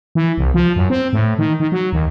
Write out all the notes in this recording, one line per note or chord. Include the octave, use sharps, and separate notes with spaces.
E3
C2
F3
F#2
C4
A2
D#3
D#3
F#3
D#2